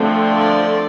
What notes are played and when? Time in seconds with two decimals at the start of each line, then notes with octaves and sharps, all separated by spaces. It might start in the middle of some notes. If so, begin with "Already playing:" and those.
Already playing: D3 F3 A3 C4
0.33 D5